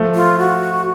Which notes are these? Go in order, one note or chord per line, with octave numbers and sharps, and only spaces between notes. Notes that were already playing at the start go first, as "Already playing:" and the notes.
Already playing: F3 A3
F4
F#4